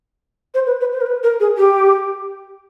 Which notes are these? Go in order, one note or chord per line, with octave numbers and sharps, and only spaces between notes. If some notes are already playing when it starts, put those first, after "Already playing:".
C5
B4
B4
C5
A#4
B4
A#4
G#4
G4